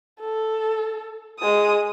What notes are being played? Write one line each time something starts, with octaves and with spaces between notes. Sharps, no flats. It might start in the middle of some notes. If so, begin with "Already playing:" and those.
A4
G#3 D#6